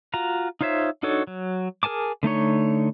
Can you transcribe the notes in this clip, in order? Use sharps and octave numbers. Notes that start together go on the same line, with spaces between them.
F4 F#4 A#5
D#4 F4 C5 C#5 E5
D4 D#4 F#4 A4 C#5
F#3
G#4 A#4 G#5 A5 D6
D3 A3 D#4 C#5